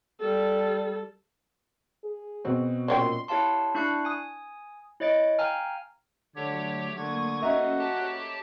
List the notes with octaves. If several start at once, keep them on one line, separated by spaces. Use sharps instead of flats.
G3 A4
G#4
B2 C4 F#4
A#2 C#4 C#5 G5 C6
E4 G4 C#5 F5 A5 C6
D4 E4 C#6 F#6 C7
G#5 D#6
E4 C#5 D#5 A6 D7
F5 G5 G#5 A#5 F6
D3 F#3 A3 G4 C#5
D3 A#3 C#6 D#6 G#6
C#4 F#4 A4 C5 D#5 E5 A#5
G4 C#5 A5 B5